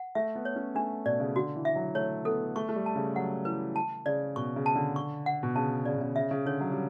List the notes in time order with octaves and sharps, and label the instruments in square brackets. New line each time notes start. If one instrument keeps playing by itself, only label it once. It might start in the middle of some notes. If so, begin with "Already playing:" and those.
Already playing: [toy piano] F#5
[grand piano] A3 [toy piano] E5
[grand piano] B3
[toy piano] C#5
[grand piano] C#4
[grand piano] A3 [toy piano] D4
[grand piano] B2 [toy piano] D5
[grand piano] C#3
[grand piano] D3 [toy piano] F#4
[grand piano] E3
[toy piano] E5
[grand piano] F#3
[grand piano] A3 [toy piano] C#5
[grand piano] B3 [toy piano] A4
[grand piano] A3 [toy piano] C#6
[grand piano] A3
G3
[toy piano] A5
[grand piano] C#3
[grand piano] F#3 [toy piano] F#5
[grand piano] E3 [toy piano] B4
[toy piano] A5
[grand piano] C#3 [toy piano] D5
[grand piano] B2 [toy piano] C#6
[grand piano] C#3
[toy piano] A5
[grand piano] D3
[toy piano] C#6
F#5
[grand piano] B2
[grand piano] C#3 [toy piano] A5
[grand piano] C#3 [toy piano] D5
[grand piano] B2
C#3
[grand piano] C#3 [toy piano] E5
[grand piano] C#3
[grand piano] D3 [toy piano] C#5
[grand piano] F#3
G3